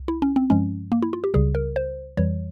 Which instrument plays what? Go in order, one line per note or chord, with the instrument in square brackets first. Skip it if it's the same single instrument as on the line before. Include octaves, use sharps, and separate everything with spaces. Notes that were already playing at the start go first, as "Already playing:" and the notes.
Already playing: [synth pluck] C2
E4
C#4
C4
G2 F3 G#3 C#4
A#3
E4
F4
G4
C#2 C#3 G3 G#4
A#4
C5
F2 E3 G3 C#5